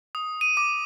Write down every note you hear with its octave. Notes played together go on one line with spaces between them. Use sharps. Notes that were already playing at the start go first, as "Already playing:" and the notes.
D#6
D#7
D6